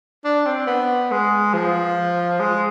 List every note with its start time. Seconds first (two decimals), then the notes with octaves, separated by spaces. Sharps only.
0.25 D4
0.46 C4
0.67 B3
1.11 G#3
1.53 F3
2.40 G#3